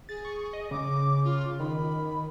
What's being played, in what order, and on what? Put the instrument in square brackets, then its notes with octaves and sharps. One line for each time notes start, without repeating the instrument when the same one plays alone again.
[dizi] G#4 [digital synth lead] A6
[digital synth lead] C#6
D#5
[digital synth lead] C#3 [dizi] D6
[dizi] F4
[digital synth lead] D#3 [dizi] B5